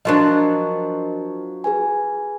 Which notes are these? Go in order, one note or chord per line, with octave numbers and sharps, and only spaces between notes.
F3 F#3 D4 A#4 D#5
G#4 B4 G#5